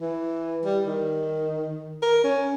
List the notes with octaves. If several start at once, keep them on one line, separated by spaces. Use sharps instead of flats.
E3
G3
D#3
A#4
C#4